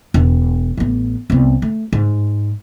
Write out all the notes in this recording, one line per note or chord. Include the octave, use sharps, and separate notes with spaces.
E1
A1 B3
C2 B3
A3
G#2